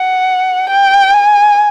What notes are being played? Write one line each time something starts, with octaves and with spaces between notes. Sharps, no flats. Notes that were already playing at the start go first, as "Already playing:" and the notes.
Already playing: F#5
G5
G#5